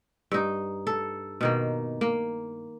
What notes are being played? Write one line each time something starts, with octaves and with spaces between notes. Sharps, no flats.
G2 D#4
A4
B2 D#3 A#3
A#3